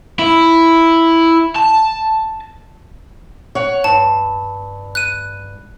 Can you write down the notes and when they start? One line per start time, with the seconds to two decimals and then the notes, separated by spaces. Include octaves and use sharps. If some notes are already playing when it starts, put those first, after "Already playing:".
0.19 E4
1.56 A5
3.55 C#5 F#5
3.84 G2 A5
4.95 F#6 D#7